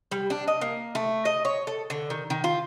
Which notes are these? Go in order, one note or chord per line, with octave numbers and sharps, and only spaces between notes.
G3
D4
D#5
A#3
A3
D#5
C#5
A4
D3
D#3
D#3
F4